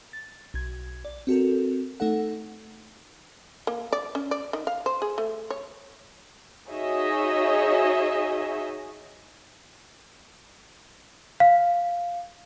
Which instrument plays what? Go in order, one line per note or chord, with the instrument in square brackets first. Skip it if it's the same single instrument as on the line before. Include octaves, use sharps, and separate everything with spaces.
[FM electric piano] A6
B1 G#6
D5
C4 F#4 A4 A#4
A3 D#4 A4 F#5
[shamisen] A#3
D5
C#4
D5
D#3
F5
C5
G#4
A3
C#5
[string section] D#4 F#4 G#4 C#5 D#5 E5
[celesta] F5